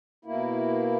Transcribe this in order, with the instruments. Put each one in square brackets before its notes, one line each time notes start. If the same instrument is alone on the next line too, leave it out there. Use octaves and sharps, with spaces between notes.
[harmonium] B2 A#3 E4